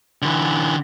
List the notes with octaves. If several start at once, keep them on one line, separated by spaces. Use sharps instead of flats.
D3 E3